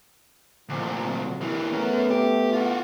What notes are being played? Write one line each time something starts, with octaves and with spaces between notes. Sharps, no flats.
D2 A#2 F3
C3 F#3
E3 A#3
A3 B3 C#4 A#4
G4
F4 F#4